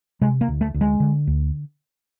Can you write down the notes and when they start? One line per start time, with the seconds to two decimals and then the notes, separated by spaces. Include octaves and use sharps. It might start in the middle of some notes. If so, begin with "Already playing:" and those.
0.21 C3 G#3
0.41 A#3
0.48 D2
0.61 A3
0.74 D2
0.81 G#3
1.00 D3
1.27 D2